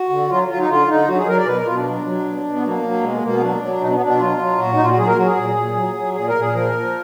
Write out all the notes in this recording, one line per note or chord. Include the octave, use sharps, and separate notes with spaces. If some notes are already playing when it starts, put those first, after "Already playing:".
Already playing: F#4
D3
F#3 F4
F#3 F4
D#4
D3 F4
D3 D#4
F#3 F#4
G#4
F#3 A#4
D5
B2 B4
A#4
B2 F4
D4
F#3
F#3
B2
B2
B3
F#3 A#3
F#3
B2 G#3
B2 A#3
B3
F#3 D4
F#3
B2 D#4
D4
B3
B2 D4
F#3 F4
F#3
A#2 F#4
D#4
A#2 F4
F#4
F#3 G#4
A#4
F#3 F#4
G#4
A#2
A#2
F#3
F#3
A#2 G#4
A#4
A#2
G#4
F3 A#4
F3